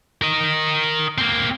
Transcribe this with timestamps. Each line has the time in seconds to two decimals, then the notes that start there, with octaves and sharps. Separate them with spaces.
0.22 A#4 D#5
1.18 A#3 C4